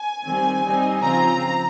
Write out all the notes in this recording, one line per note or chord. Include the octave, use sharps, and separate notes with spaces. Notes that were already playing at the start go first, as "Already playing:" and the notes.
Already playing: G#5
D#3 G3 C4
G3 C4 D#4
C#3 F3 C4 F4 A#5